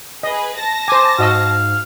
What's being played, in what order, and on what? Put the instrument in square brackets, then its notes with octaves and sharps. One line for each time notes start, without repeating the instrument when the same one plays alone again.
[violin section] G#4 B4 [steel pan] D#5
[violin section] A5 A#6
[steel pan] C5 G#5 [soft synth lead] D6
[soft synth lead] G#2 [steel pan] F#4 D#5 E6 [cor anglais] F5